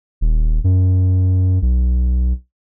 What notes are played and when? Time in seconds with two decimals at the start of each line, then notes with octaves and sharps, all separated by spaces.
0.21 D#1
0.64 F#2
1.62 B1